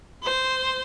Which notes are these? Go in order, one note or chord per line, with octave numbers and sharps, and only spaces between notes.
C5